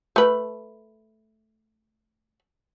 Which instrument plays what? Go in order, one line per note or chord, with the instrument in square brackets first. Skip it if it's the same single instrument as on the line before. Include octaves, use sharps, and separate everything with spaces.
[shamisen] A3 B4